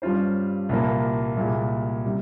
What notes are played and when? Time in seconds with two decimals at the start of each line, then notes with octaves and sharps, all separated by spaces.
0.02 G2 G3 C#4 F4 C5
0.69 C2 A#2 F3 A#3
1.37 C2 A#2 G#3
2.06 C3 G3